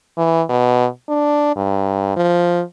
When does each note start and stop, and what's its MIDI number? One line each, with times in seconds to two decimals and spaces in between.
0.17 0.42 52
0.49 0.87 47
1.09 1.51 62
1.56 2.15 43
2.16 2.62 53